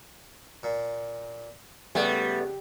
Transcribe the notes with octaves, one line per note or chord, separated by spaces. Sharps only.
A#2
C#2 G3 A3 B3